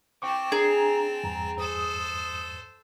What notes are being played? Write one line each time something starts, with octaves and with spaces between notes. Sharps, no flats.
C4 G5 A5 C#6 D6
D4 G#4 A#5
E2 G2 A#5
A4 C5 D#6